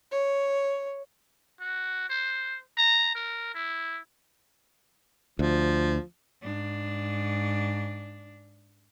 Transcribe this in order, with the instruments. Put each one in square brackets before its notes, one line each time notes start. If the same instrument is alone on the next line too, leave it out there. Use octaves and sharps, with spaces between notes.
[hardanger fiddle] C#5
[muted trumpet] F#4
C5
A#5
A#4
E4
[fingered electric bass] D2 [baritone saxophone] F3
[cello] G#2 D4